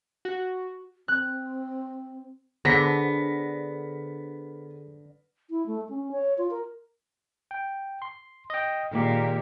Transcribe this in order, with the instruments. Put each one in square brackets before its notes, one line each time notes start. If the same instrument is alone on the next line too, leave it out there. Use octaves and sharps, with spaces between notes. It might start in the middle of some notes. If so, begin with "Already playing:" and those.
[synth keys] F#4
[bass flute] C4 [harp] F#6
[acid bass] D3 [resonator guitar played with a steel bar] B3 [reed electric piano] G#4 C5 [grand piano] A#6 B6
[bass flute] E4
A3
C#4
C#5
F4
A#4
[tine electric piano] G5
C6
D#5 G5
[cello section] A#2 [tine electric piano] D#3 G#3 G4